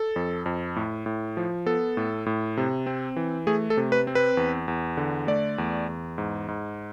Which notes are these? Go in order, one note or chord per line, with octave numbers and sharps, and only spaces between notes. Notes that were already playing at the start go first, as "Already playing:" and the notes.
Already playing: A4
F2
F2
A2
A2
F3
B3 A4
A2
A2
C3
C4
E3
A3 G#4
A4
C3
B4
C4
B4
E2
E2
D3
A3 D5
E2
E2
G#2
G#2